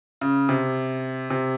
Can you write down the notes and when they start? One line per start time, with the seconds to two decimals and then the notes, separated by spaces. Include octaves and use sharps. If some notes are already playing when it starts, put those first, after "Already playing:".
0.21 C#3
0.49 C3
1.30 C3